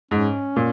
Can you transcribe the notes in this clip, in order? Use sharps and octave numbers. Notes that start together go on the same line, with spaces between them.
G#2 C#4
A#2